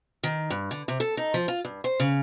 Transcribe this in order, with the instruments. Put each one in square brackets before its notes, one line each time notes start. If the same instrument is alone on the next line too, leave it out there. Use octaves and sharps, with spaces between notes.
[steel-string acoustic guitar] D#3
G2
D3
C3
A4
D#4
F3
F4
G2
C5
C#3